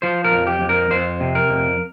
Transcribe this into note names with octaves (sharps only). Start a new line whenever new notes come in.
F3 C5
A#4
F2
G4
F2
A#4
F2 C5
C3
A#4
F2